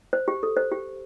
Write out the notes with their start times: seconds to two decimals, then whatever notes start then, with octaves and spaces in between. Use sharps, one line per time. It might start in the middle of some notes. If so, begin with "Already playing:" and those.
0.13 C5
0.28 G4
0.43 A4
0.57 C5
0.71 G4